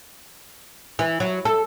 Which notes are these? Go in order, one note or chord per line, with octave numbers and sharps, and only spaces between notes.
E3
F#3
A4